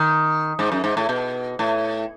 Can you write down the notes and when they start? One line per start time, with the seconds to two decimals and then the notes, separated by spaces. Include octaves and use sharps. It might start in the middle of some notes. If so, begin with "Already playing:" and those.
Already playing: D#3
0.59 G#2
0.72 F#2
0.84 G#2
0.97 A2
1.09 B2
1.59 A2